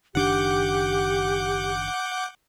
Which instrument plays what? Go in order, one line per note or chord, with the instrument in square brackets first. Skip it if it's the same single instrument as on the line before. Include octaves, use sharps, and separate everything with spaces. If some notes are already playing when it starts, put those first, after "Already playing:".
[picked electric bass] F#1 D#3 D4 [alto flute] G4 [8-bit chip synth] F#5 D6 G6